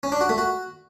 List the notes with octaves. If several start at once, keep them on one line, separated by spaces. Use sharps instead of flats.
C#4
D4
F#4
A3
F#4